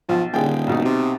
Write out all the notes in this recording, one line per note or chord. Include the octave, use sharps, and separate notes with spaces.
B1 F3
D#1 D3 G#4 G5
B1 B2 D#4
C3